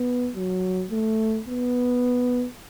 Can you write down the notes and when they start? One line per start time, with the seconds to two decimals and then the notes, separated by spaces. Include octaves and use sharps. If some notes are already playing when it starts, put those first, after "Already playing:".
Already playing: B3
0.36 F#3
0.91 A3
1.46 B3